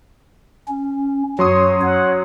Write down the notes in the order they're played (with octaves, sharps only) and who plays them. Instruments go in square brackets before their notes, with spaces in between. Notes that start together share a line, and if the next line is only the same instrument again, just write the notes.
[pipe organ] C#4
[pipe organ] F#2 [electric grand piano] F#3 C6 D#6 [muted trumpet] C#5
[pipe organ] C#5 [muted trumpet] F#5